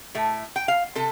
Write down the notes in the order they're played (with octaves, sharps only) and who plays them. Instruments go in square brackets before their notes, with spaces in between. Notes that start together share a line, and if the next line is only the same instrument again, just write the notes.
[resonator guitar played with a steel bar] A2 A3
G5
F5
C3 A4